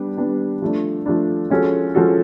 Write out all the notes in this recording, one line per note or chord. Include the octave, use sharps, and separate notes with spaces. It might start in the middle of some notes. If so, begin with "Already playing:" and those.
Already playing: G3 B3 D4 G4
G3 B3 D4 G4
F3 A3 D4
F3 A3 D4
F3 G#3 C#4 F#4 A4
F3 G#3 C#4 F#4 A4